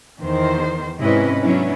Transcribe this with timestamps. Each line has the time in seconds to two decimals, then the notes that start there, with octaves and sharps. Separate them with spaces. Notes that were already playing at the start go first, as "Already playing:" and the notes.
0.20 E2 D#3 C5
0.98 G#2 C3 C#4 E4 B4 D#5
1.40 F#3 B3 C#4 D4 E4